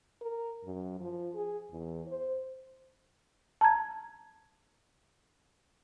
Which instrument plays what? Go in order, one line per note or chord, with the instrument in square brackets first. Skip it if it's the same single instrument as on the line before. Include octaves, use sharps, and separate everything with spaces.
[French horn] A#4
F#2
F3
G#4
E2
C5
[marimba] A5 A#5 G#6